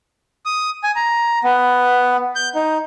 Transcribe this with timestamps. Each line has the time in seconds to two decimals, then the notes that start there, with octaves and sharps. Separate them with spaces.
0.46 D#6
0.84 G#5
0.96 A#5
1.44 B3
2.36 G6
2.55 D#4